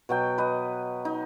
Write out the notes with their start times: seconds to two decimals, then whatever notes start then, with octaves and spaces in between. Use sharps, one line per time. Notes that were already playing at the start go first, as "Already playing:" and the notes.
0.09 B2 F#3 G5
0.38 B4 D#5
1.05 D#4